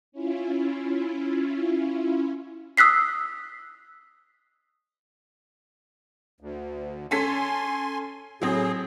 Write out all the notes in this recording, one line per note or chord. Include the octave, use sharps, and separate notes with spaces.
C#4 E4 F4
D#6 E6 F#6 B6 C7
D2
C#4 A4 G#5 C6 B6
A2 F#3 C4 G#4